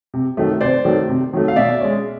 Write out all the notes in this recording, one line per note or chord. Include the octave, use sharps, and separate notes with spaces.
C3
D#3 F#3 A3
C3 C5 D5
D#3 F#3 A3
C3
D#3 F#3 A3
F5
B2 D5 E5
G#3 C#4